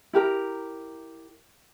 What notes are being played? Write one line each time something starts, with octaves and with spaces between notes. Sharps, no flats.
E4 G4 A#4 A#5